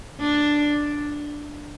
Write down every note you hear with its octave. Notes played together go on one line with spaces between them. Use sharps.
D4